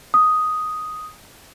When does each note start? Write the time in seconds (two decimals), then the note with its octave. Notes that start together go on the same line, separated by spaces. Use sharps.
0.14 D#6